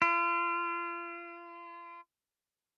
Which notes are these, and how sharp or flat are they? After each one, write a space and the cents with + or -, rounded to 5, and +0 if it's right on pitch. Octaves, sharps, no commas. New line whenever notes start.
F4 -35